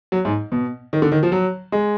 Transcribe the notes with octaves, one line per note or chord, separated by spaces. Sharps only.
F#3
G#2
B2
D#3
D3
D#3
F3
F#3
G#3